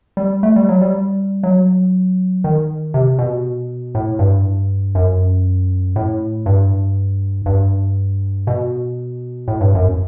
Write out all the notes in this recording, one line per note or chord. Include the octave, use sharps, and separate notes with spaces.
G3
A3
G3
F#3
G3
F#3
D#3
C3
B2
A2
G2
F#2
A2
G2
G2
B2
A2
G2
F#2